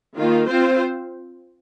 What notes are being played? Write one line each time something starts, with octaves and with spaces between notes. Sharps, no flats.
D#3 A#3 F4
C4 F4 C5